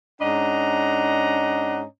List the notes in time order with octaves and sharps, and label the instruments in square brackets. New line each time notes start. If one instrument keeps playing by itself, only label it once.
[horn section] G#2 C#4 D4 D#5 F#5 A#5